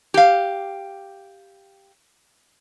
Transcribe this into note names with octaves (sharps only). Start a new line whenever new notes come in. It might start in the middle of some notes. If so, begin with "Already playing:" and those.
G4 F5